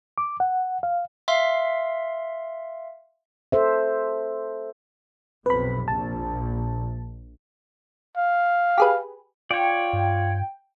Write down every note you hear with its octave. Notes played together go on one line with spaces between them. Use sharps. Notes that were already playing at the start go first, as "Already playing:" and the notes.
D6
F#5
F5
E5 F5 C6
A4 C5 E5
B1 F2 C3 B4 B5
A#1 A5
F5
G4 G#4 B4
F4 C#5 D5 G5
G2